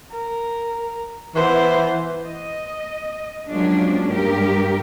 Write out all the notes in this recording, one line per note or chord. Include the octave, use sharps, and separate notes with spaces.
A#4
E3 B3 C5
D#5
F3 F#3 G#3 A#3 C#4 D4
G2 G4 A#4